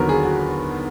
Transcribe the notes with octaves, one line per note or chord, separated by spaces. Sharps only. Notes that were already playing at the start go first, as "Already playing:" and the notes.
Already playing: D#2 D3 F#3 B3 F#4 A#4
G#4
F#4